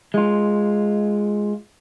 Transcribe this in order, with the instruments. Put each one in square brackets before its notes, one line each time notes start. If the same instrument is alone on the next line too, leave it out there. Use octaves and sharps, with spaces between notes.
[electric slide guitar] G#3 F4